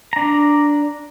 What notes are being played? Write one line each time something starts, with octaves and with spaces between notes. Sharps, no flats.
D4 A#5